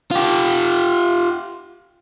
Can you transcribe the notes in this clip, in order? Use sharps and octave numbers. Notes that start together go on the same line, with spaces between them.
F4 G4